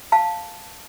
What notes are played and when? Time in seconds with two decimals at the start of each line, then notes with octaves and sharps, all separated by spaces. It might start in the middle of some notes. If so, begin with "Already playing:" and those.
0.12 F5 A5